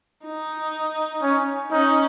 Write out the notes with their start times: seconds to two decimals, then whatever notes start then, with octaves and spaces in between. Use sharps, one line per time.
0.26 D#4
1.22 C#4
1.71 C#4 D#4